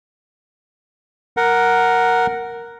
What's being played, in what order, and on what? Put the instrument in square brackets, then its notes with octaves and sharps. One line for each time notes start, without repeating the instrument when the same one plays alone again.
[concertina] A#4 F#5